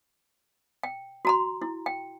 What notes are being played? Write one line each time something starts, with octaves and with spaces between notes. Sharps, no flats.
G5
F#4 A#5 C6
E4
G5